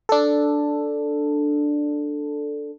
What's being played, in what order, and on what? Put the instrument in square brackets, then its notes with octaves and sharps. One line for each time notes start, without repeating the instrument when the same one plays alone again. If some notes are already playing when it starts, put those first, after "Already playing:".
[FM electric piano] D4 A4